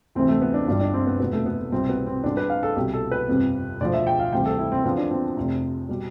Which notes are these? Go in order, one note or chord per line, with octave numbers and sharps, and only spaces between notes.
D2 C3 E3 C4
A3
B3
D4
G1 G2 D3 G3 D4
D4
C4
B3
F1 E2 B2 B3
A3
B3
C2 B2 G3 C4
B3
C4
E2 D3 G3 D4
B4
F5
A4
C2 B2 G3 G4
A4
B4
G1 F2 C3 G3
E1 D2 D3 F3 D5
E5
G5
F5
D2 C3 E3 G3 G5
A4
E4
C4
E2 D3 F3 B3
D4
C4
F1 F2 C3
B2 G3